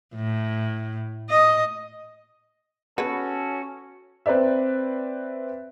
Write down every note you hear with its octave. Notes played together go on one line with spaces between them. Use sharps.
A2
D#5
B3 C#4 F#4 G#4 A4 B4
C4 B4 C5 D5 E5